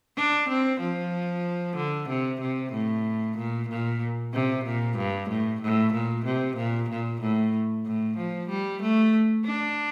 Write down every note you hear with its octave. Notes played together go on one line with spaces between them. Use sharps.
D4
C4
F3
D3
C3
C3
A2
A#2
A#2
C3
A#2
G2
A2
A2
A#2
C3
A#2
A#2
A2
A2
F3
G3
A3
D4